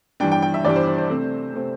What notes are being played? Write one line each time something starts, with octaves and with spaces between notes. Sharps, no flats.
G2 E3 G3 D4 G5
G5
G5
E5
G2 E3 G3 D4 D5
C5
C5
C5
C3 A3 C4
C3 A3 C4